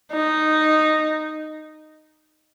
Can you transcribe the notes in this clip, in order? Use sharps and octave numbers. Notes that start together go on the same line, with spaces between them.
D#4